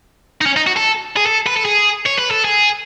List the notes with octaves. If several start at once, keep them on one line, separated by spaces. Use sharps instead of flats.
D#4
C#4
D#4
F#4
A4
G#4
A4
B4
A4
G#4
C#5
B4
A4
G#4